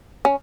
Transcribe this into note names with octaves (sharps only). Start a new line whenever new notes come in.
C#4